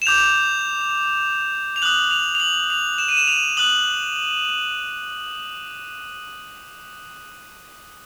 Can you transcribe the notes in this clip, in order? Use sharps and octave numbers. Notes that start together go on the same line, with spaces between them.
E7
D6 G6 F7
F7
D#6 F#6 F#7
F7
F7
F#7
F7
E7
D#7
E7
F7
D#6 F#6 F#7